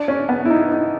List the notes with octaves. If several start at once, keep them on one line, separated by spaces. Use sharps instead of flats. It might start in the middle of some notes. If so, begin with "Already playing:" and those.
Already playing: D4
C#4
B3
E4
D#4
D#4